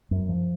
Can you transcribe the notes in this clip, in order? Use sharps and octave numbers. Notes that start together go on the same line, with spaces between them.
F#2
F3